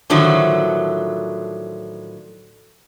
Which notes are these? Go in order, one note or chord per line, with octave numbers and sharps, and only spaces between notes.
A2 D3 D#3 F3 F#3 E5